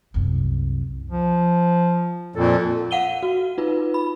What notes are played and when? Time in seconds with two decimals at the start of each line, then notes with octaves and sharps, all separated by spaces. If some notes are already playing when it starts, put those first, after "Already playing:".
0.14 C2 F#2
1.10 F3
2.36 F2 A#2 A4
2.91 F5 F#5 D#7 G7
3.23 F#4
3.58 D#4 F4 B4
3.94 B5